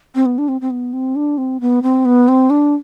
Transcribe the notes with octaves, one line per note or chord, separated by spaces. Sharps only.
C4
B3
D4
C4
C4
B3
C4
D4
C4
B3
C4
B3
C4
D4